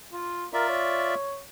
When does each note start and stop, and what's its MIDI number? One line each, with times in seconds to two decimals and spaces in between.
0.13 0.44 65
0.53 1.15 65
0.53 0.65 70
0.53 1.15 74
0.53 1.15 76
0.69 1.41 73